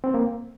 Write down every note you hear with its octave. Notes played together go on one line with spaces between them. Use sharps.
C4
A#3